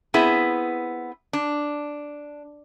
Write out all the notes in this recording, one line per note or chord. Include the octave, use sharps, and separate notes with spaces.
B3 C4 E4 G#4
D4